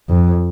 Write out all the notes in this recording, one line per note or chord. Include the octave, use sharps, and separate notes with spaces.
F2